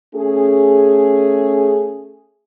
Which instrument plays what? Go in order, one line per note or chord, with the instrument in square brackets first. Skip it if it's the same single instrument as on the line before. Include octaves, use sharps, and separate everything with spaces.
[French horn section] A3 C#4 G#4